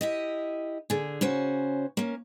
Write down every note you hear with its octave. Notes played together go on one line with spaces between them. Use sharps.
E4 G4 D#5
D3 G#4
C#3 C#4 F#4 C5
A#3 C#4